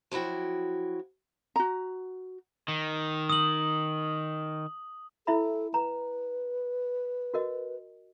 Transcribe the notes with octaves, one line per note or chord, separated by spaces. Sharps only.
F3 F#3 E4 F#4 G5
F#4 A#5
D#3
D#6 F#7
E4 A4 E5 B5
B4 A#5
F#4 A#4 D#5